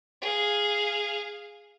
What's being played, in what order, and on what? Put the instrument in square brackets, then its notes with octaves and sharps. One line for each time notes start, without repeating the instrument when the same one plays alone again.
[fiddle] G#4 F5